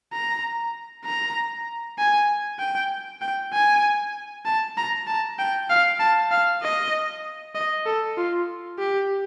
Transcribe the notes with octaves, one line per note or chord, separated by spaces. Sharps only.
A#5
A#5
G#5
G5
G5
G#5
A5
A#5
A5
G5
F5
A5
F5
D#5
D#5
A4
F4
G4